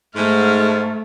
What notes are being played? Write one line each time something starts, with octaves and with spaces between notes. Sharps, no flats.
G#2 A3 F6